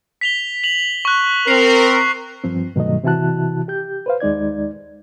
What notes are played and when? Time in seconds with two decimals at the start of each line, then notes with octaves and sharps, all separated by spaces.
0.21 B6 F7 G7
0.64 F7 F#7
1.05 C#6 F#6
1.47 C4 A#4 C7 F7
2.44 G2 F3 C4
2.75 G2 B2 D#3 F#3 A3 D#5
3.04 C3 E3 E4 F#4 A5 F#6
3.68 G4 G6
4.06 B4 C5 F5
4.20 D#2 G#3 D#4 D5 G#6